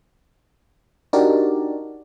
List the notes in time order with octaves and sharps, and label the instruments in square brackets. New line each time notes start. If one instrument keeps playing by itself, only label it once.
[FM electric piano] D4 D#4 F#4 G4 A#4 D5